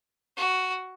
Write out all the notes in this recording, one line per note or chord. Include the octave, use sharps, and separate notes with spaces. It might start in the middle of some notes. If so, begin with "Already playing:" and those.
F#4